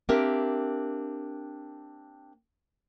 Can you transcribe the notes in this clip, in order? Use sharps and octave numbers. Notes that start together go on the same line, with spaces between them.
A#3 C4 D4 G4 A#4 E5